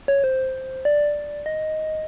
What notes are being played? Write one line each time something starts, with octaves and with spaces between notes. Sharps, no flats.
C#5
C5
D5
D#5